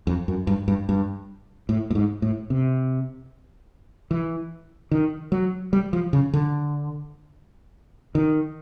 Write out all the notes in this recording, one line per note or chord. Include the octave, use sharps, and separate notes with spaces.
F2
F#2
G2
G2
G2
A2
A2
G#2
A2
C3
E3
D#3
F#3
G3
F3
C#3
D3
D#3